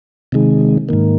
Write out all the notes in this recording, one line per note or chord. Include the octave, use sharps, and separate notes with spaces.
C3 D#3 G#3
G#2 D#3 A#3